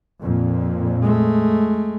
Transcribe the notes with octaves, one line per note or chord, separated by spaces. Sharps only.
F2 A#2
G#3 A3